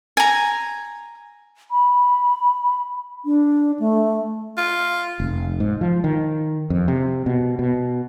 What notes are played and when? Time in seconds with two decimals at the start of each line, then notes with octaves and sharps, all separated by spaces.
0.17 G#5 A#5
1.71 B5
3.25 D4
3.79 A3
4.57 F4
5.20 F1
5.60 G#2
5.81 F3
6.04 D#3
6.70 F2
6.88 C3
7.26 B2
7.59 B2